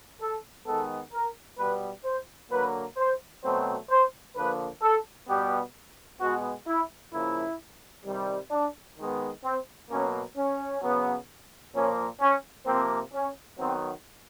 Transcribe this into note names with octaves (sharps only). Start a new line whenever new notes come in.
A4
D#3 G#3 B3 A4
A#4
B2 G3 B3 B4
C5
D3 F#3 A#3 B4
C5
B2 F#3 A3 C4 C5
C5
D3 F3 A#3 B4
A4
B2 G3 B3 G4
B2 G#3 B3 F#4
E4
C#3 F3 A#3 E4
C3 D#3 G3
D4
D#3 G#3 B3
C4
B2 F#3 A#3 C#4
C#4
C#3 F#3 B3
A#2 F3 A#3 C#4
C#4
C3 F3 A#3 C4
C#4
D#3 F#3 B3 C4